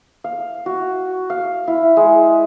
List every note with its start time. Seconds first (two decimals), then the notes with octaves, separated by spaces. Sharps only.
0.24 F5
0.66 F#4
1.30 F5
1.68 E4
1.97 G#3